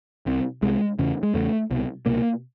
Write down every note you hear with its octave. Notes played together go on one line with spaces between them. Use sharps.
C2 C3
C2 C3 G#3
E2 C#3
G#3
E2 C#3 A3
C2 B2
C2 B2 A#3